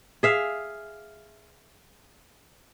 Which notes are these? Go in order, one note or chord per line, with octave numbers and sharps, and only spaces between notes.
G#4 E5 F5